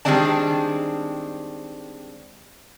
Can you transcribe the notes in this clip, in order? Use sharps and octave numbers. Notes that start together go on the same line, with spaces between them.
D#3 G3 G#3 C4 D4 A5